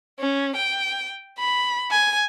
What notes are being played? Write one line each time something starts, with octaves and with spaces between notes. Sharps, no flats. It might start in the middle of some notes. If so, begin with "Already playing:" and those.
C#4
G5
B5
G#5